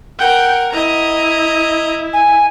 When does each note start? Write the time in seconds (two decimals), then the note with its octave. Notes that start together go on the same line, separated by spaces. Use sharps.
0.19 A#4 F#5 G5
0.72 E4 D#5 A#5
2.13 G#5